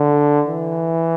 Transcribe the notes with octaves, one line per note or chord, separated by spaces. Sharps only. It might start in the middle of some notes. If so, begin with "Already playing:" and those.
Already playing: D3
E3